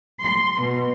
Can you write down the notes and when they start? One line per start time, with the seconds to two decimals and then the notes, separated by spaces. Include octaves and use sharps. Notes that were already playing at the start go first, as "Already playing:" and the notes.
0.22 C6
0.61 B2